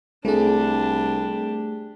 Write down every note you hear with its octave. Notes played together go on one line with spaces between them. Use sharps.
C2 A3 D4 G4 G#4